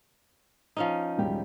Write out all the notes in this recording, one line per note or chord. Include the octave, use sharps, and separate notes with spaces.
F3 C#4 D#4
E1 G3 G4